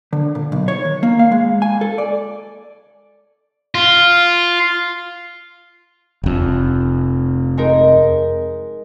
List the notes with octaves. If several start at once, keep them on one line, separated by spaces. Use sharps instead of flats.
D3
A#2
B1
C#5
D#3
A#3
F5
G#3
G#5
A4
D5
F4
F1 F2
G#3 D#4 A#4